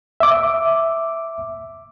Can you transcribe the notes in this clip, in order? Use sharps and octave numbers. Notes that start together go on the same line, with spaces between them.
E5 D6